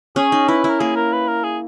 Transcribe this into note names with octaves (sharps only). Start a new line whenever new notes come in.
C#4 G#4
D#4
E4 B4
E4 A#4
A#3 G#4
A#4
B4
A#4
G#4